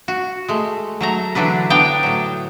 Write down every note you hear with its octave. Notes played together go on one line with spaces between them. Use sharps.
F#4
G#3 A3
F#3 A3 A#5
D3 E3 F#3 D4 B4
B3 D4 G5 A5 A#5
A2 F#3